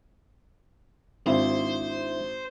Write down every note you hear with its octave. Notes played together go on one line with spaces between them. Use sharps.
G#1 D4 E4 C5 E5